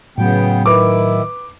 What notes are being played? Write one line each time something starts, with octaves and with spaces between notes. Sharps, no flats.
A2 C#3 F#3 B3 G5
D#3 E4 B4 D6